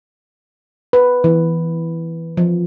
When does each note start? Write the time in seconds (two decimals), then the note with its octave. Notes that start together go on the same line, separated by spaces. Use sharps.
0.93 B4
1.24 E3
2.37 F3